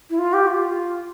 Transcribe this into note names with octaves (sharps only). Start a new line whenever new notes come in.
E4
F4
G4
F4